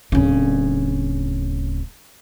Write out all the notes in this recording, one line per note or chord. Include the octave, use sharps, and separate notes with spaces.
D1 C#3